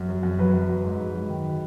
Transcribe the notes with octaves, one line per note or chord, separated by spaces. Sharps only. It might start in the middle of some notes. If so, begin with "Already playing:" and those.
Already playing: F#2
F#3
F#2
F#3 B4
F#2
F#3
G#2
G#2
F#3
D#3